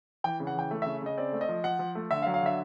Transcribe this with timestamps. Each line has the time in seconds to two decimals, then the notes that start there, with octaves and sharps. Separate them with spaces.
0.24 E3 G5
0.40 C#3
0.47 F#5
0.55 E3 G5
0.71 A3
0.82 C#3 E5
1.02 C#3 D#5
1.18 C4 D5
1.32 A3
1.41 D#5
1.49 F3
1.64 F3 F#5
1.79 F3
1.95 A3
2.11 D3 E5
2.22 F5
2.26 F#3
2.34 F5
2.42 D3 E5